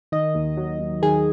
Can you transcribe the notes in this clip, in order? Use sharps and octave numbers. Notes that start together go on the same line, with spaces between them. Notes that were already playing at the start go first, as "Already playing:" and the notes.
D#3 D#5
D#2
F#3
D#2
D#3 G#4